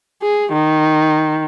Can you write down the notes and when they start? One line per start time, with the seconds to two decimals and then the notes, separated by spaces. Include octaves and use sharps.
0.22 G#4
0.52 D#3